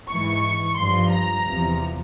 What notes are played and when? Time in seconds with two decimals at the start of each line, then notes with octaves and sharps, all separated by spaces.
0.10 G#2 E3 C#6
0.77 G2 F3 C6
1.11 A#5
1.45 E2 C3 F3